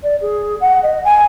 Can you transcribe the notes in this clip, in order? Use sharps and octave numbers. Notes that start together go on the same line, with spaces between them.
D5
G#4
F#5
D#5
G#5